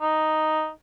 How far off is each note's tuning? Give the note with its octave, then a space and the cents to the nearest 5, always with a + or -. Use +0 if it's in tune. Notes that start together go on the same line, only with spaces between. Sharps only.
D#4 +0